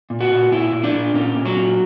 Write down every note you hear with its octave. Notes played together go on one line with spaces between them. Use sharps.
A#2
F#4
A#2
A#2 E4
A#2
D4
A#2
A#2 C#4
A#2
F#3
A#2